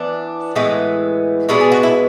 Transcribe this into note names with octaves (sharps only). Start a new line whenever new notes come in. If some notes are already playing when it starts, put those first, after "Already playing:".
Already playing: E3 B3 D4
A2 E3 G#3 B3
B2 G#3 B3 D4 E4
G#4
F#4
E4